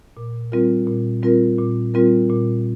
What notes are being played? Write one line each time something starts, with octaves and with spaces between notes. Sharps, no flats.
A#2
G3 C4 F4 A#4
A#2
G3 C4 F4 A#4
A#2
G3 C4 F4 A#4
A#2